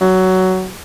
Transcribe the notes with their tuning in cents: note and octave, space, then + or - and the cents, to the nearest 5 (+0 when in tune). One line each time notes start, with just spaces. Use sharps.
F#3 +15